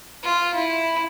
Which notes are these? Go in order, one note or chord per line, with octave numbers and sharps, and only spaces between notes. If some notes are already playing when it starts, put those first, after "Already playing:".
F4
E4